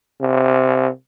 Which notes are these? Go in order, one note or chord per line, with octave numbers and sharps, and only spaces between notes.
C3